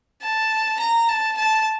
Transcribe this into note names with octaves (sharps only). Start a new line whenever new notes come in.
A5
A#5
A5
A5